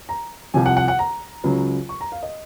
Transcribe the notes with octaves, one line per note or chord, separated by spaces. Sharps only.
A#5
C2 C3 F3 G#5
F#5
F#5
F#5
A#5
C#2 C#3 F#3
C#6
A#5
F5
D#5